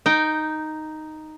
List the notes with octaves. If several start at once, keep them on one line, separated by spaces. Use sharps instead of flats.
D#4 G5